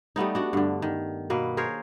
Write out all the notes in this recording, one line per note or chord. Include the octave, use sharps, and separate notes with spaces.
G3 A3 B3 D#4
D4 F#4
G2 D3
D#3
B2 A#3 B4
G#4 A#4 C5 C#5